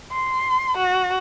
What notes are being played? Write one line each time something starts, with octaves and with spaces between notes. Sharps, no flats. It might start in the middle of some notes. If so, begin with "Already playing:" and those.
C6
F#4